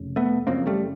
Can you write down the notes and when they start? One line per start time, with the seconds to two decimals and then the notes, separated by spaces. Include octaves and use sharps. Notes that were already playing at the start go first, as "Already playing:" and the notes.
Already playing: F1 C#3
0.16 A3 B3
0.47 F#1 F2 C#3 A#3 C4
0.67 G3 A3